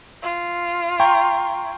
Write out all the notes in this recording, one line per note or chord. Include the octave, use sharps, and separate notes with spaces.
F4
G5 A#5 C6 C#6